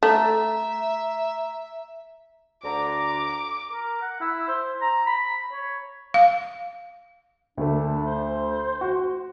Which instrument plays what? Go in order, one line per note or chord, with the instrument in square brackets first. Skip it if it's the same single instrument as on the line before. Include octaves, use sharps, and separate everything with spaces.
[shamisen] A3 [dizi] E5 [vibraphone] A#5
[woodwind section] D2 D3 A#5 [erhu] D6
[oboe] A#4
F#5
E4
C5
A#5
B5
C#5
[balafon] F5
[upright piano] D2 A3 [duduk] D4
[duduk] C5
[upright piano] F#4